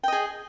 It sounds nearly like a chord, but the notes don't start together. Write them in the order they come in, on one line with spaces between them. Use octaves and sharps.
G5 D#5 G#4